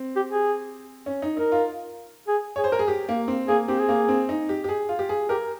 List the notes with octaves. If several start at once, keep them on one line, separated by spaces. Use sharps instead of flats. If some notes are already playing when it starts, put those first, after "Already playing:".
Already playing: C4
G4
G#4
C#4
D#4
D#4 A#4
F4
G#4
G#4 C#5
C5
A#4
G#4
G4
A#3
C4
A#3 G#4
C4 G4
G#4
A#3
C4
D#4
G4
G4
G#4
F4
G4
G#4
G4 A#4